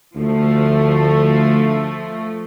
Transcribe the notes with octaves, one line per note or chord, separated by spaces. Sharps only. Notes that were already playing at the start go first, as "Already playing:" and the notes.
D2 F3 A3